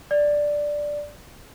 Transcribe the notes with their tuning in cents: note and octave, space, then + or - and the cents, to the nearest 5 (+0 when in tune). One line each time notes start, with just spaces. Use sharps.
D5 +0